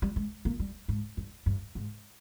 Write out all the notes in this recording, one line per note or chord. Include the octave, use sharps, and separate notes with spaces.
G3
G#3
A#3
G3
G#2
G2
G2
G#2